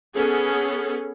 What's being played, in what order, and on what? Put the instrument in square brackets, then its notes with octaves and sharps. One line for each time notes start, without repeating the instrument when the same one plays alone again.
[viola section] B3 C#4 G#4 A4